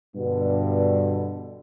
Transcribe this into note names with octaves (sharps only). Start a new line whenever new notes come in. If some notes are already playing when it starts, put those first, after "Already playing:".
G2 B2 D3